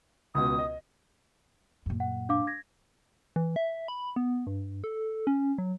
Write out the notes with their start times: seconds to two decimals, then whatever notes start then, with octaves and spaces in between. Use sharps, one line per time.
0.35 C#2 B2 D#6
0.58 D#5
1.86 F#2 A#2
2.00 F#5
2.29 D4 F5 D6
2.47 G#6 A#6
3.36 E3
3.56 E5
3.88 B5
4.16 B3
4.47 G2
4.84 A4
5.27 C#4
5.58 F#3